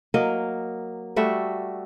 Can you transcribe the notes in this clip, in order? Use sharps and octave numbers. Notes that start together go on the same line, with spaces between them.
F#3 A#3 A#4 D#5
G3 A3 F#4 E5